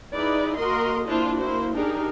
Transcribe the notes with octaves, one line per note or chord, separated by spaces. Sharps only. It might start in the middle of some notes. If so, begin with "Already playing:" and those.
D#4 E4 G#4 B4 D5
A#3 F#4 A#4 D#5 C6
A#3 D4 E4 F4 C5
A#3 E4 F#4 C5
D4 D#4 G4 G#4 A#4